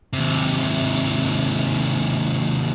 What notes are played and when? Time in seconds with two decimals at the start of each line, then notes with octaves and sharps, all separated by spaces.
0.13 D#2 C3